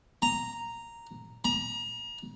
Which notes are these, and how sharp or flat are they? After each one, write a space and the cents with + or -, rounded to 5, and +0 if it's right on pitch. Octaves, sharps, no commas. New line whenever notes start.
A#5 -5
A#5 +30